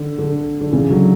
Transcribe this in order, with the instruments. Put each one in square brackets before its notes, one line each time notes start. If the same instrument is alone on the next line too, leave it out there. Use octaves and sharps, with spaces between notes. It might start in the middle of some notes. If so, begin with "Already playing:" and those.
Already playing: [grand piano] D3
D3
D3
C#3 E3
D3 F#3